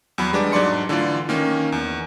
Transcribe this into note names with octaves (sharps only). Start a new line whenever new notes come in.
E2 F#3 B5
G3 G#3 D4 B4 D6
G#2 F#3 D4 D5 C6 C#7
D3 E3 A3 F4 D5
D#3 A#3 C#4
E2